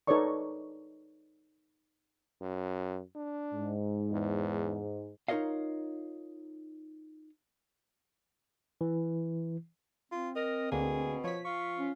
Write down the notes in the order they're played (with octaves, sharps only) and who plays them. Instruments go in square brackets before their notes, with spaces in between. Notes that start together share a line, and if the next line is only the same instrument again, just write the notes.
[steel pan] D#4 A4 B4 C#5 D5 C#6
[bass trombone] F#2
D4
[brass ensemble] G#2
[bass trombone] E2
[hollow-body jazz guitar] D#4 F4 A#4 C#5 D#5 F5
[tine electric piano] E3
[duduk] C4 [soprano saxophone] F4
[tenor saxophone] A#4 [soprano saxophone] D#5
[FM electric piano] D2 D3 A#3 [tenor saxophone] B2 [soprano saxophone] G#4
[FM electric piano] F3 B6 [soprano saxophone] C#5
[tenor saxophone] F4 [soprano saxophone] C#6
[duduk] C#4